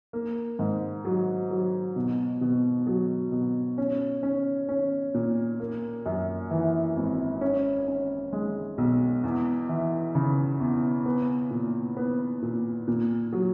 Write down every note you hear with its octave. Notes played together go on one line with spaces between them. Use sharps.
A#3
G#2
F#3
F#3
B2
B2
F#3
B2
C#4
C#4
C#4
A#2
A#3
F#2
E3
G#1
C#4
C#4
G#3
B1
E2
E3
C#3
E2
B3
A#2
B3
A#2
A#2
F#3